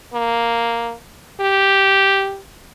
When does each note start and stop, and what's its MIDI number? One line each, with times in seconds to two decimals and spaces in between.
0.14 0.93 58
1.41 2.40 67